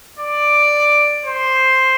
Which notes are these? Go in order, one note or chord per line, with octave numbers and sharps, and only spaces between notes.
D5
C5